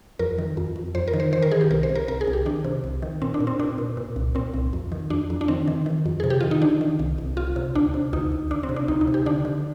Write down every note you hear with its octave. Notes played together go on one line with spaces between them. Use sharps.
F2 A#4
D#3
F2
F2
F2 C5
A#4
D#3
C5
D#3 C5
A#4
D#3 G#4
G4
C2 A#4
C5
C2
A#4
C2 A#4
G#4
C2
G4
D#3 D4
C3
C2
D#3
A#2 C4
D4
A#2
C4
A#2 D4
A#2
A#2
C2
A#2 C4
C2
F2
D#3
F2 D4
F2
D4
D#3 C4
D#3
D#3
F2
C3 G#4
G4
D#3 F4
D#4
D#3 D4
D#3
C2
C2
C2 F4
C3
D2 D4
C3
D2 D#4
D2
D2 D4
C4
C3
D4
D2 D#4
D#4
C3
G4
D3 D4
D3